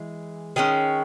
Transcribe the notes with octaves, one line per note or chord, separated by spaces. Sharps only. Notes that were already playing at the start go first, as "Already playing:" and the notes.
Already playing: E3 G#3
D#3 G#3 C#4 D#5